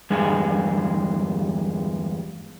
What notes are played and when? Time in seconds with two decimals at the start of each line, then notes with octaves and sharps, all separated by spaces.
0.10 E2 G2 G#3 G#4